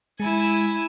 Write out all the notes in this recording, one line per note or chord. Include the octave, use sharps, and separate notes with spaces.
G#3 E4 G#5